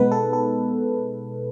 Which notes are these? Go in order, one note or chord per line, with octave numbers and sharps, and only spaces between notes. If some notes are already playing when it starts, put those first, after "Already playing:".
Already playing: B2 G#3 B3 D#4 B4
A4
A4